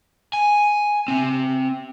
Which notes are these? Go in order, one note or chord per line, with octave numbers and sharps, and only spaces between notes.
G#5
C4 E5